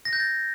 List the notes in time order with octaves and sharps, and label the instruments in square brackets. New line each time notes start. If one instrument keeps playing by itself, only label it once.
[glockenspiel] A#6
G6
A6